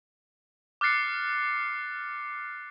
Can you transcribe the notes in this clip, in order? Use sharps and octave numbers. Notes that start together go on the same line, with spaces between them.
D6 F6 F#6 A6 C7 C#7